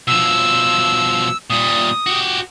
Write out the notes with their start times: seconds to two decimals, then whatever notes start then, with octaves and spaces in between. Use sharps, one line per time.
0.07 B2 F3 E6
1.50 A#2 G3 D#6
2.06 F#4 G4